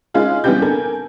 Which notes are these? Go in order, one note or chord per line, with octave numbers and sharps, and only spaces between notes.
G#3 C#4 D#4 F4 G#4
E3 G3 B3 C#4 G4 G6
D4 A4 A#4 G#5